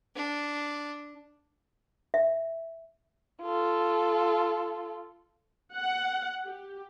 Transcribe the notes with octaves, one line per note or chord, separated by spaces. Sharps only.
D4
E5
F4 A4
F#5
G4